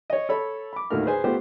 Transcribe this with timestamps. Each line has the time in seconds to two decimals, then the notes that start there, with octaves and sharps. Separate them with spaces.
0.10 C#5 D#5
0.29 A4 C#5 B5
0.73 B5 D6
0.91 D#2 A2 D3 F#4 A#4 F6
1.05 G#4 B4 C5 G#5
1.24 A3 B3 F4 G4 C5